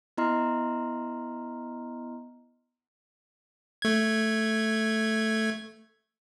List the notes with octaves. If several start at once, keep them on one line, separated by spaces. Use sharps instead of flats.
B3 E4 D#5 A#5 C6 F6
A3 G#6